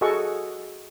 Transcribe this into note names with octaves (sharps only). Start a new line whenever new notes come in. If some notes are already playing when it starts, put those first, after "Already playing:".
F#4 G#4 A4 D#5 F#5 C#6